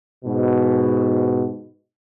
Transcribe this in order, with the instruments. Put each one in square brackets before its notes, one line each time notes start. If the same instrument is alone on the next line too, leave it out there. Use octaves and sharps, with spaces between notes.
[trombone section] G#2 B2